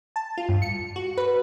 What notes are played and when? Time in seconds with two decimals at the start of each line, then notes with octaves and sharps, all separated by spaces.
0.16 A5
0.37 F4
0.49 G2
0.62 C#7
0.96 F#4
1.17 B4